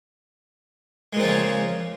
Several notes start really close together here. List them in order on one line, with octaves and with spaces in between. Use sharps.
G#3 A#2 C4 F3 C#3